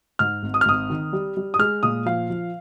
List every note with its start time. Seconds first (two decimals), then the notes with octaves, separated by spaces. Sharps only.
0.19 G#2 F6
0.43 G#1
0.54 D#6
0.61 F6
0.66 G#1 D#6
0.90 D#3
1.13 G3
1.37 G3
1.54 D#6
1.59 G#3 F6
1.83 A#2 D#6
2.06 F3 F5
2.30 F3